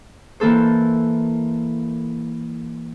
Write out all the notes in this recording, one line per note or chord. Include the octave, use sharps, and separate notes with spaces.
E3 A#3 A4 C5